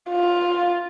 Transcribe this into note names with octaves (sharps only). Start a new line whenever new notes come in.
F4